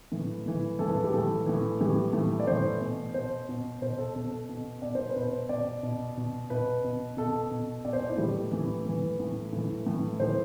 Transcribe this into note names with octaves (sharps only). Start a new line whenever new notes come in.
A2 E3
A2 E3
A2 E3 A4
B4
A4
G4
A2 E3 A4
A2 E3
A2 E3 G4
A2 E3
D5
A2 E3 C5
B2
B2 C5
B2
B2 C5
A4
B2 A4
B2
B2 D5
C5
B4
B2
C5
B2 D5
B2
B2
B2 B4
B2
B2 A4
B2
B2 D5
C5
D5
E4
A2 E3 G4
A2 E3
A2 E3 B4
A2 E3
A2 E3
A2 E3
A2 E3 C5